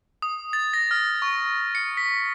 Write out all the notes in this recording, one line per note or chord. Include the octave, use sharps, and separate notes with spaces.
D#6
A6
A#6
F6
C#6
C#7
B6